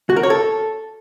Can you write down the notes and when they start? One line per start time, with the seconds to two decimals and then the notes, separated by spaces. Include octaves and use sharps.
0.10 F#4
0.16 A#4
0.23 C#5
0.30 A4